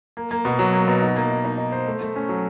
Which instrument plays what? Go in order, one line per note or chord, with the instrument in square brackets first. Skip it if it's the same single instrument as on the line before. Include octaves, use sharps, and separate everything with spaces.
[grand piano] A#3
A#3
B2
F#3
A#3
B2
D#4
A#3
D#4
D#4
D#4
C5
A3
A3
C#4
F#3